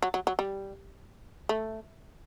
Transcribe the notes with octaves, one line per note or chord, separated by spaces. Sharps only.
F#3
F#3
F#3
G3
A3